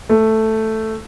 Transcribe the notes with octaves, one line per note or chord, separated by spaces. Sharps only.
A3